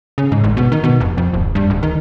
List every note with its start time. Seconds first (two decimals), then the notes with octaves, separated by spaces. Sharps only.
0.18 C#3
0.32 G#2
0.44 G#1
0.57 B2
0.72 D#3
0.84 B2
1.01 F1
1.18 F2
1.33 D1
1.55 G2
1.70 D1
1.83 D#3